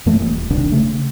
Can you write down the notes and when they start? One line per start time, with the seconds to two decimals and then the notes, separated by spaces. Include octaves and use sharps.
0.06 F#2 E3 A3 A#3
0.21 D#1
0.50 D#1 C2 D#3 D4
0.72 C#3 A3